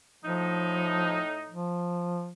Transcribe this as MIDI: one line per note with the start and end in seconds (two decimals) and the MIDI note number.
0.25 1.57 45
0.25 1.21 53
0.25 1.57 63
1.48 2.31 53